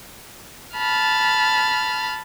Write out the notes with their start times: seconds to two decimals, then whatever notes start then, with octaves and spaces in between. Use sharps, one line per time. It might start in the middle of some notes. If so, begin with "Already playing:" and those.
0.76 A5 B5 F6